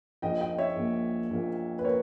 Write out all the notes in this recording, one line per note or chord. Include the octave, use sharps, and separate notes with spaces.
A#1 A#2 A#3 D#5 G5
D#5 G5
C#5 E5
A#1 A#2 A#3
A#1 A#2 A#3
B4
A#2 A#4 C#5